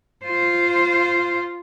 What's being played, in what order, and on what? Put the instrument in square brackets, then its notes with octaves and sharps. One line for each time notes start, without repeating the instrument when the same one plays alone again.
[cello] F4 C5